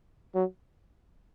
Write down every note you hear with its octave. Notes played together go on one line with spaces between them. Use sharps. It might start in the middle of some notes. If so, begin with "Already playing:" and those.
F#3